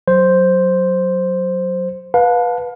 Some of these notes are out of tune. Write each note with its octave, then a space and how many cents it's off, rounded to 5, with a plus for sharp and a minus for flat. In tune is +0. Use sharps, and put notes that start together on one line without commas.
F#3 +0 C5 +0
B4 -10 F5 +30 A5 +0